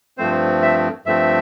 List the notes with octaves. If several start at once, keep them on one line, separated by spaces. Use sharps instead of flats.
G2 F3 A3 C4 C5
E5
G2 F3 A3 C4 E5